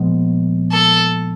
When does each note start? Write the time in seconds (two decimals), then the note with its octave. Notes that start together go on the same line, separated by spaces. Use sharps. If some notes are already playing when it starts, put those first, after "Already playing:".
Already playing: A#2 F3 G#3 B3
0.72 A4